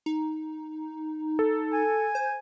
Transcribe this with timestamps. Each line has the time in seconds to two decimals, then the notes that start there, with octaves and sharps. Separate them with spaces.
0.06 D#4
1.39 A4
1.73 G#5
2.15 C5